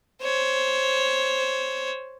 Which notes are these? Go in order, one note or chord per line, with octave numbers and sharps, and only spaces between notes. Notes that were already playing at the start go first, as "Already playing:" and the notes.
C5 C#5